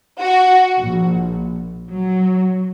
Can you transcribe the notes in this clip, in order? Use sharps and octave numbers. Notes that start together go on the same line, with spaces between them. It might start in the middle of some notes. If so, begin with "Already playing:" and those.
F#4
A#1
F#3